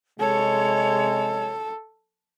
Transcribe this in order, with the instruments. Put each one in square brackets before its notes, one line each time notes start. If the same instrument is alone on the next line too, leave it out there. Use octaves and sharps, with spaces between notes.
[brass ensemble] C3 G#3 [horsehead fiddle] A4 [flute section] C#5